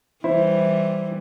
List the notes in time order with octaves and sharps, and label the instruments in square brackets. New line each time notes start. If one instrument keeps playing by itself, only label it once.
[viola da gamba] E3 G3 [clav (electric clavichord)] E4 C5